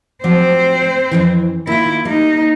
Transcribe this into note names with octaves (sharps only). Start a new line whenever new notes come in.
F3 F#3 C4 C5 D5
F2 G#2 E3
D#3 A#3 E4 F4
G3 A#3 D#4